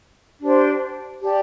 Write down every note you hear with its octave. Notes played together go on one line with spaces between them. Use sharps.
D4 G4 C5
G4 D5 A5